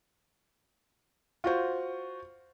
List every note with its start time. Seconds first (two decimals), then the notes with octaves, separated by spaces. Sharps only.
1.44 F4 F#4 C5